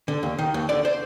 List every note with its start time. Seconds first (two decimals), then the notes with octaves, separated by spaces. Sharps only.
0.08 D3
0.23 D#2
0.38 D#3
0.54 D#2
0.69 D3 D5
0.85 C5